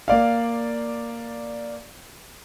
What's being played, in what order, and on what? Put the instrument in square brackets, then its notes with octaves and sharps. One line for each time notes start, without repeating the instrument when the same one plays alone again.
[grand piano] A#3 D5 F5